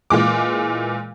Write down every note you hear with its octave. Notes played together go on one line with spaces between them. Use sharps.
A#2 E3 G#3 D6